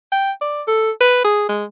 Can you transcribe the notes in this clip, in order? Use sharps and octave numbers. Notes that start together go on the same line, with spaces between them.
G5
D5
A4
B4
G#4
G#3